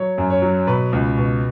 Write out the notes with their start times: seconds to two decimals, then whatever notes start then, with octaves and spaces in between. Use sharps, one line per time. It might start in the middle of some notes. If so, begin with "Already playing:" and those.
Already playing: F#3 C#5
0.18 F#2
0.30 C#5
0.42 F#3
0.67 B2 B4
0.93 C#2
1.18 B2